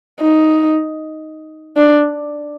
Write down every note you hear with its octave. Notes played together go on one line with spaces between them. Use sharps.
D#4
D4